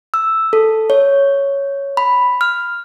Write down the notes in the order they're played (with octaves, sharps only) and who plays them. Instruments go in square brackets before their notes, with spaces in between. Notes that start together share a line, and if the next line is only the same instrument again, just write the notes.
[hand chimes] E6
A4
C#5
B5
F6